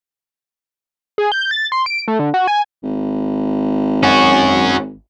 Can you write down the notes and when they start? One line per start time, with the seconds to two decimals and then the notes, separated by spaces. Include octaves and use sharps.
1.18 G#4
1.32 G6
1.51 A6
1.72 C6
1.86 D7
2.08 A3
2.19 D3
2.34 F#4
2.48 G#5
2.83 G#1
4.03 C#4 F#4